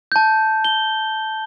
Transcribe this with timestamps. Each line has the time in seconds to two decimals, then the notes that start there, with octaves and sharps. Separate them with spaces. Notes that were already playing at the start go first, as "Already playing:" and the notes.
0.12 A5 G6
0.64 G7